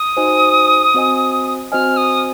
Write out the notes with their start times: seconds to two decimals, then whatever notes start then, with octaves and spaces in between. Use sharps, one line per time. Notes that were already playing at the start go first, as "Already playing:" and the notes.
Already playing: D#6
0.17 D#4 F#4 C5 D#5 G#5
0.94 C4 F#4 C5 D#5 G#5
1.72 C4 F#4 C5 D#5 G#5 F6
1.97 D#6